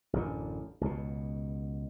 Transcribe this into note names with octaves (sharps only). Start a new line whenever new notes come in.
A1 F#2 D3
C#2 B2